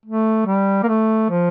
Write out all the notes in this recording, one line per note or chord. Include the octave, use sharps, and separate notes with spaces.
A3
G3
A#3
A3
F3